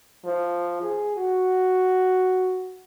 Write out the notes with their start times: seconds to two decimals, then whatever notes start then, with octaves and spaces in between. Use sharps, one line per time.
0.25 F3
0.82 G#4
1.16 F#4